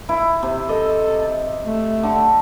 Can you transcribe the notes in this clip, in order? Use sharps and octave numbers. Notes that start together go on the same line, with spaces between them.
E4
C3
A4 D#5
A3
D3